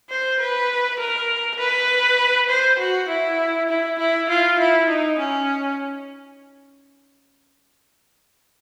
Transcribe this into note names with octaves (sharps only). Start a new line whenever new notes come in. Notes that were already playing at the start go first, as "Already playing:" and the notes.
C5
B4
A#4
B4
C5
F#4
E4
E4
E4
F4
E4
D#4
C#4